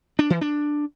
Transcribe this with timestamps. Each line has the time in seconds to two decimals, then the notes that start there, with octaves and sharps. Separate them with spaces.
0.19 D4
0.30 E3
0.41 D4